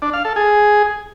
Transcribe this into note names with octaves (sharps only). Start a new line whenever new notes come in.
D4
F5
A4
G#4